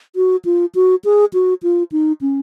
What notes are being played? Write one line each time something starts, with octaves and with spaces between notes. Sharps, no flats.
F#4
F4
F#4
G#4
F#4
F4
D#4
C#4